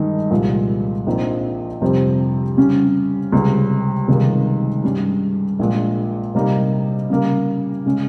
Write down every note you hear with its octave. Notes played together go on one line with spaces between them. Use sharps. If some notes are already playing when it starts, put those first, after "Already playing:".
Already playing: G2 D#3 G#3 D#4 G#4
C2 A#2 F3 G#3
A#1 A#2 F3 C4 D#4
F2 C3 G3 C4
C#3 G3 C#4
C#2 C3 G3
C#2 C3 D#3 G3 A#3
G2 G3 C#4
A#1 A#2 G#3
C3 G3 A#3 D#4
C#3 G3 A#3
C#3 G#3 C#4